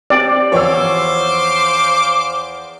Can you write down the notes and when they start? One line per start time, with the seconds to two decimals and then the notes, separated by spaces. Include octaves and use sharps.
0.10 C4 G4 D5
0.52 E2 F3 C5 C#5 F5 D6 E6